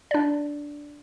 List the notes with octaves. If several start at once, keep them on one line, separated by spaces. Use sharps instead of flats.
D4 D5